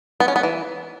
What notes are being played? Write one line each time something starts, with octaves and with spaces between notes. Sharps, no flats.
B3
C#4
B3
E3